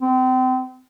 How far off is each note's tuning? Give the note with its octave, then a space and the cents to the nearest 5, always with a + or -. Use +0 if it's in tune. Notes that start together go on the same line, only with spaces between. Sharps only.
C4 -30